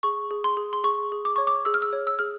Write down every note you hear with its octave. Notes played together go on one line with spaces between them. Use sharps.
G#4 C#6
G#4
C6
G#4
C6
G#4 C#6
G#4
D6
C#5 C#6
D6
G#4 E6
F6
E6
C#5
E6
G#4 F6